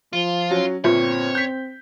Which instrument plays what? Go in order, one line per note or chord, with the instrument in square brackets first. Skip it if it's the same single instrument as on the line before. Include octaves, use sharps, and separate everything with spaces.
[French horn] F3 [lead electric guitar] F4
[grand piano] F#3 C#4
[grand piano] G1 A#2 [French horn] C4 [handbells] F4 E5 [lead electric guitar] C#5
[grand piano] G6 B6